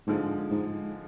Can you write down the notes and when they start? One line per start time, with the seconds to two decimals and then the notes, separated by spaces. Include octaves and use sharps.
0.07 G#2 D3 F3 G#3
0.51 G#2